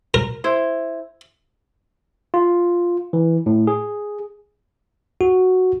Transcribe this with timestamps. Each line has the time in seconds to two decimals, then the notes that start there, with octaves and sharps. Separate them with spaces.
0.14 A#4
0.44 E4 C5
2.34 F4
3.13 E3
3.46 A2
3.67 G#4
5.21 F#4